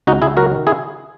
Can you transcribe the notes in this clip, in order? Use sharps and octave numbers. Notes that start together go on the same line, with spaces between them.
C#2 D#4 F#4
C#2 E4 G#4
F#3 F#4 A#4
D#3
E4 G#4